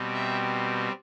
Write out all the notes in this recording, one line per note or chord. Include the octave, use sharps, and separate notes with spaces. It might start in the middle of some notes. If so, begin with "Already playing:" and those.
Already playing: B2 G3 C4
E5